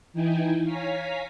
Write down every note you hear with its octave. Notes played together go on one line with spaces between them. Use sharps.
E3 D#4 E4 G5 G#5
C#5 F5 G#5 A#5 B6